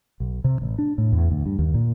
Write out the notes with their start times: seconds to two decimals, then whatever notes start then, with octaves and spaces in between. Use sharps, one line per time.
0.20 B1
0.44 C3
0.62 A1
0.78 D4
0.98 A2
1.12 E2
1.30 D2
1.46 G2
1.59 D#2
1.74 A#2